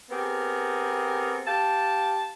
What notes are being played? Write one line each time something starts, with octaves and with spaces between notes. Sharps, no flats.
B3 C4 G4 G#4 A#4
G4 F5 A5